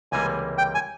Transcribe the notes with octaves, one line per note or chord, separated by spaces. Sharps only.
C#2 C3 E3 G3 A#3 G#5
G5
G#5